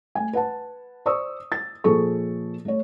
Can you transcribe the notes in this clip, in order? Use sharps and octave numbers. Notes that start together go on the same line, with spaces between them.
A3 G#5
B4 F#5 A5
C5 D5 C#6 D#6 E6
A6
A#2 F3 G#4 A4 C#6
A3 C#5